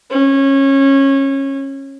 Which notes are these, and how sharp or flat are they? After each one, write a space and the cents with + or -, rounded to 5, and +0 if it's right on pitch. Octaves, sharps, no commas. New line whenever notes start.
C#4 -20